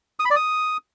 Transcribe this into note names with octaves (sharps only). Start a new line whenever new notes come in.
D#6
B5
D5
D#6